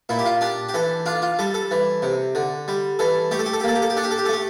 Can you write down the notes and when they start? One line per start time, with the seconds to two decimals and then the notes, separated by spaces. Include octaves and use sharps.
0.09 A#2 E4
0.19 G4
0.25 F4
0.41 D4 G4
0.69 G4
0.74 E3 A4
1.06 D4 F4
1.22 F4
1.39 G3 A4
1.54 A4
1.71 E3
2.02 C3
2.35 D3
2.68 G3
2.99 E3 A4
3.31 A3 G4
3.39 A4
3.46 G4
3.53 A4
3.60 G4
3.64 A#3 A4
3.75 G4
3.82 A4
3.90 G4
3.97 D4 A4
4.04 G4
4.11 A4
4.18 G4
4.25 A4
4.29 A3 G4